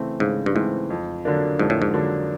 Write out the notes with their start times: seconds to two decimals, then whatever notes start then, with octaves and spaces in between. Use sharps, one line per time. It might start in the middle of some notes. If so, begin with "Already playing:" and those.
Already playing: C#3 E3 A3 C4
0.20 G#2 C#3
0.46 G2
0.55 G#2 E3 A3 C4
0.90 F2
1.25 D3 F#3 A#3 D4
1.59 F2 G#2
1.70 A2
1.82 G#2
1.94 D3 F#3 A#3 D4